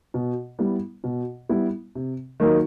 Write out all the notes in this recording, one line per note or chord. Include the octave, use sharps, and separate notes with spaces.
B2
G3 B3 E4
B2
G3 B3 E4
C3
D#3 F#3 A#3 D#4